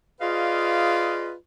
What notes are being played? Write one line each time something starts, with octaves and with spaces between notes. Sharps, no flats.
F4 G#4 B4 D5 D#5 F5